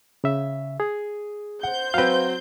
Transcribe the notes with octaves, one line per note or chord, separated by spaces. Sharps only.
C#3 E5
G#4
C5 F#5 G6
F#3 C4 B4 F5